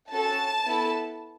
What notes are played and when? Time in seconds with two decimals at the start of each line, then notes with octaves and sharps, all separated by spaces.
0.12 C#4 F#4 A4 A5
0.66 B3 E4 A4